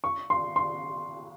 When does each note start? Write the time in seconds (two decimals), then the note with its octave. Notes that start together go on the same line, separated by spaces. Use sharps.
0.04 C#6
0.30 C6
0.56 C6